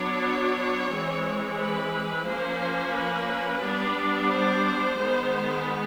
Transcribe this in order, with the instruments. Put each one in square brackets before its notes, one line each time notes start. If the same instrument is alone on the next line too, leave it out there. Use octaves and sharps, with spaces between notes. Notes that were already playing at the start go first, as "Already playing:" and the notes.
Already playing: [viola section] F#3 B3 D4 C#5
E3 G#3 C4
B4
F3 A#3 C#4 C5
B4
G3 B3 D4
C5
D#3 G#3 B3